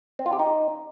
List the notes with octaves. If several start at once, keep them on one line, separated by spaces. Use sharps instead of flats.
C4
F4
G4
D#4